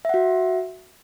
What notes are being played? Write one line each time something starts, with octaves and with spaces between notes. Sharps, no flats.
F#4 E5 F#5